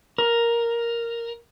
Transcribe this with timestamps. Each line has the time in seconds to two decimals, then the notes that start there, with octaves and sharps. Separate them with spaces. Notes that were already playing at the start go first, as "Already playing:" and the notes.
0.18 A#4